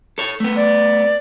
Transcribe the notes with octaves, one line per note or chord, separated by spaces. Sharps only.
A4 C#5
A3 B3
D5